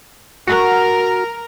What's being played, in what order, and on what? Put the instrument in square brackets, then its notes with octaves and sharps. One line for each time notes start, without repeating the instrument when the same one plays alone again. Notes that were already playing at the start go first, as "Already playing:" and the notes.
[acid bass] F#4 [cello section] A#4